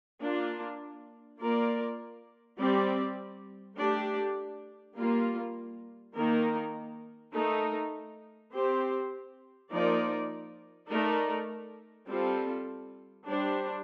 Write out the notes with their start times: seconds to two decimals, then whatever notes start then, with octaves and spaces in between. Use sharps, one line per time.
0.22 A#3 D4 F4
1.40 A#3 F4 A#4 D5
2.58 G3 C4 G4 D5
3.78 A3 D4 G4 D5
4.96 G3 A#3 F4
6.15 D#3 A#3 D#4 A#4
7.33 A3 D#4 A#4
8.53 C4 G4 C5
9.71 F3 A#3 D#4 A#4 D5
10.90 A3 D#4 A#4 D5
12.09 G3 C4 F4 A4
13.27 G3 D4 G4 C5